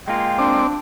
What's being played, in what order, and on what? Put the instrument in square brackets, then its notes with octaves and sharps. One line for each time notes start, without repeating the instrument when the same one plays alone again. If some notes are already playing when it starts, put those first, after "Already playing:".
[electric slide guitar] G#3 A#3 F4 [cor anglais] G5
[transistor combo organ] C4 D5 [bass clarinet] D4